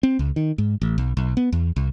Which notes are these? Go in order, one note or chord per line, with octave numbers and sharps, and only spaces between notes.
C4
C#2
D#3
G#2
A1
B1
B1
B3
E2
C2